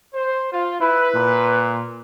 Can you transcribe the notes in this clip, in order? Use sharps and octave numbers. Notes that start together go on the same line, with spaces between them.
C5
F4
E4 B4
A#2